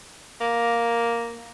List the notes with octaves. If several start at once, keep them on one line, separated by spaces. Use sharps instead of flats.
A#3